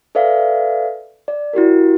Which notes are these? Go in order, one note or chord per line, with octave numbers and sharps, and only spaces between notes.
A4 B4 D5 E5 F5
D5
E4 F#4 G4 A#4